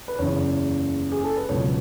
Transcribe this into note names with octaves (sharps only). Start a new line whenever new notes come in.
B4
F#1 E2 C#3 C#5
G#4
A4
B4
C#2 B2 F#3 C#5